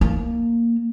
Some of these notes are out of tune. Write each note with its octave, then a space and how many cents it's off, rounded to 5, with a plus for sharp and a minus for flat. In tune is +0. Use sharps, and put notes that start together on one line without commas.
A#3 -5